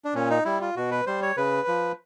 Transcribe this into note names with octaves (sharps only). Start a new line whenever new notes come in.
D4
A#2 C#4
D#4
G3 E4
F4
B2 F#4
B4
G3 C5
C#5
C#3 B4
F3